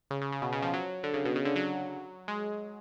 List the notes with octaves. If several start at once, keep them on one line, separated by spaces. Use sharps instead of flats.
C#3
C#3
C#3
B2
C#3
F3
F#3
D3
C#3
B2
C#3
D3
F#3
G#3